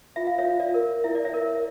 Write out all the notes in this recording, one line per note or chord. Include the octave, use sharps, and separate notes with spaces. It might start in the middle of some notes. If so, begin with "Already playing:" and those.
F4 E5
F5
C#5 E5
F4
D5
A#4
E4 E5
D5
C#5 E5
A#4